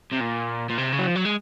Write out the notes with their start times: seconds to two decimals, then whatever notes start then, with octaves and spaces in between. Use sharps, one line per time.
0.12 C3
0.20 A#2
0.70 A#2
0.78 C3
0.93 C#3
0.99 F#3
1.07 F3
1.15 F#3
1.25 G#3